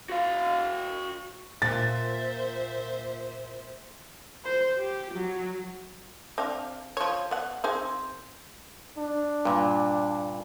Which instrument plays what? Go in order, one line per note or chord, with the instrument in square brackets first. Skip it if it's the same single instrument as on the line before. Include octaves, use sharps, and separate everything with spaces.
[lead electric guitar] F#4 F5
[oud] A#2 [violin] C5 E5 [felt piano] A6
[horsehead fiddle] C5
G4
F#3
[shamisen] C4 D4 F5
F3 C#5
B3 F#5
C4 D#4 G#4
[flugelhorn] D4
[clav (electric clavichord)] G2 A#2